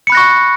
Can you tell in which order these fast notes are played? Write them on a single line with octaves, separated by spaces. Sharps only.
C#7 B5 F#6 A#6 C#6